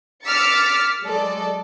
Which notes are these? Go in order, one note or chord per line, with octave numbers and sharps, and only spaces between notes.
D6 E6 F6 A6 B6 C#7
F#3 G#3 A4 D5